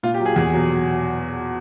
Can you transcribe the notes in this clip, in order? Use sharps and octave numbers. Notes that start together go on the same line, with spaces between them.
A#2 F4
G4
F#3
G#4
E2 G#4
B2 F#3